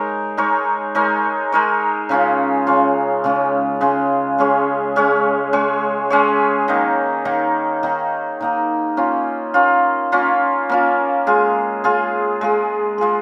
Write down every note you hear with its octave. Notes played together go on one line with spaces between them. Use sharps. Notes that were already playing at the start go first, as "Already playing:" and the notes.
Already playing: G#3 D#4 A#4 C#5
G#3 D#4 A#4 C#5
G#3 D#4 A#4 C#5
G#3 D#4 A#4 C#5
C#3 G#3 C#4 F4
C#3 G#3 C#4 F4
C#3 G#3 C#4 F4
C#3 G#3 C#4 F4
G#3 C#4 G#4 C#5
G#3 C#4 G#4 C#5
G#3 C#4 G#4 C#5
G#3 C#4 G#4 C#5
D#3 A#3 D#4
D#3 A#3 D#4
D#3 A#3 D#4
D#3 A#3 D#4
A#3 C#4 F4
A#3 C#4 F4
A#3 C#4 F4
A#3 C#4 F4
G#3 F4 G#4
G#3 F4 G#4
G#3 F4 G#4
G#3 F4 G#4